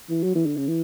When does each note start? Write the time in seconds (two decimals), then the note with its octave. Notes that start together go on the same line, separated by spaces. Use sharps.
0.09 E3
0.23 F#3
0.35 E3
0.46 D3
0.57 C#3
0.68 E3